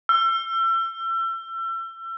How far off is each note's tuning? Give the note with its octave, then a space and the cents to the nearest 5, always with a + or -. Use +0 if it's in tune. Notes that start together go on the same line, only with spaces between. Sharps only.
E6 +35